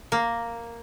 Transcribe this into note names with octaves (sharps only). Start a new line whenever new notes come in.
A#3